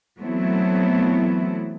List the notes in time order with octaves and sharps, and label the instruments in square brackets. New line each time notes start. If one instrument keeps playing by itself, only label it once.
[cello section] E3 F#3 A3 B3 C4 E4